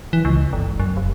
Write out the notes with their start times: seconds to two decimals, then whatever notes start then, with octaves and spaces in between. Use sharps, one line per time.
0.13 E3
0.25 C#2
0.53 G1
0.80 F#2
0.97 F1